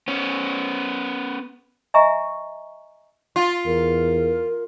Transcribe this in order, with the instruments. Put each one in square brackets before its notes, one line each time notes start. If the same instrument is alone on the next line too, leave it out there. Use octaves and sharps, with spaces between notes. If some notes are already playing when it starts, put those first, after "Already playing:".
[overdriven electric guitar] B3 C#4
[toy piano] D#5 E5 G#5 A#5 C#6
[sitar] F4
[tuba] E2 [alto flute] A#4